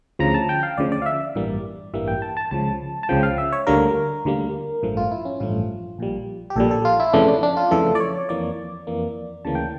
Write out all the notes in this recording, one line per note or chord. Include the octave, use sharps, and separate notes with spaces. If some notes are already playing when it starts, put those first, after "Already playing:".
D2 C#3 F3 A#5
A5
G5
F5
D2 C#3 F3 D5
D5
F5
E5
D5
A1 G2 E3 G3 A#3
A1 G2 E3 G3 A#3 E5
G5
A5
A5
C#2 C#3 F3 A5
A5
C#2 C#3 F3 G5
F5
E5
C#5
D2 D3 G3 A#3 A#4
D2 D3 G3 A#3
A1 G2 F3 A3
F4
E4
C#4
A1 G2 F3 A3 F4
A#1 A#2 G3
G4
A#1 A#2 G3 A4
A4
F4
E4
F2 C#3 E3 A3 D4
D4
D4
F4
F2 C#3 E3 A3 A4
D5
C#5
F2 E3 A#3 D5
F2 E3 A#3
D2 C#3 E3 A#3 A5
G5